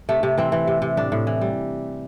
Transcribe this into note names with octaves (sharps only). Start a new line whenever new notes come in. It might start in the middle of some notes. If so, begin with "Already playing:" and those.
C3 A3
C3
E3 C4
E3
C3
C3
A2 D4
A2
E3
G3